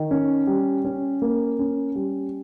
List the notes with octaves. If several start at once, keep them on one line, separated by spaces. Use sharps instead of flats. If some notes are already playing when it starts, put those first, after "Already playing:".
Already playing: D#3
C#4
G3
C#4
A#3
C#4
G3